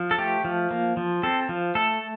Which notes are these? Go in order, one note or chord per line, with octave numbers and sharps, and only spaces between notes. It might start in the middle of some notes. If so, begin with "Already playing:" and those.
Already playing: F3
A4
A3 G4
F3
A#3
F3
C4 A4
F3
A3 A4